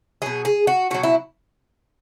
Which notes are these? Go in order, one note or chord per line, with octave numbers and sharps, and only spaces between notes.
B2 F#3 G#4
G#4
F#4
B2 F#3 F#4
E4